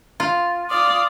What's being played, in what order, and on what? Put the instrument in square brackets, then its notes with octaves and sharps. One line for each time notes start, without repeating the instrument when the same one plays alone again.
[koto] F4
[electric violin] D5 F5 [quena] D#6